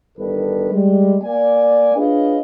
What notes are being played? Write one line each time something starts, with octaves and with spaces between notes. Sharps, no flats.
G1 D#3 D4 A4 B4
G3 G#3
A#3 D5 G#5
D4 F4 G#4 B4 C#5 D#5